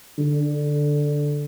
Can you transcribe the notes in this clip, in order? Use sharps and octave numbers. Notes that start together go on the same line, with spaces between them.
D3